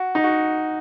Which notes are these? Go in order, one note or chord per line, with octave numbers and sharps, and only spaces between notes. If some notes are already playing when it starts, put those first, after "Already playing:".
Already playing: F#4
D#4
F#4